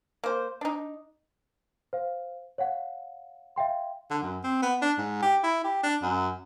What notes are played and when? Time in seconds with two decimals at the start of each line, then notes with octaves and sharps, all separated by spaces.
0.24 A#3 C5
0.61 D4 D#4
1.93 C5 F5
2.58 C#5 F5 F#5
3.56 E5 F5 G5 C6
4.10 D3
4.22 F#2
4.44 C4
4.62 B3
4.82 D4
4.98 G#2
5.22 G4
5.44 E4
5.64 G4
5.83 D4
6.02 F#2